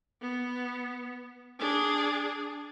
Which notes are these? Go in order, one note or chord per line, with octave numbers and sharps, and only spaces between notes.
B3
D4 G#4